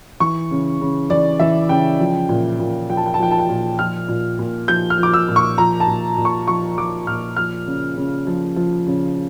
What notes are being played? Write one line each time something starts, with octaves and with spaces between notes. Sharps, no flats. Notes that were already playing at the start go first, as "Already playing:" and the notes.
E3 C#6
C#3
C#3
E3 D5
E3 E5
C#3 G5
F3
A#2
A#2
F3 G5
A5
G5
A5
F3 G5
A5
G5
A#2
F3 F6
A#2
A#2
F3 G6
F6
F3
D6
E6
A#2
C#6
F3 A#5
A5
A#2
A#2
C#6
F3 C#6
F3 D6
A#2 F6
F3 F6
C#3
C#3
F3
F3
C#3